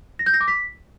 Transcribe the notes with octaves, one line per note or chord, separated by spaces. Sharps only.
A#6
G6
A#6
D6
B6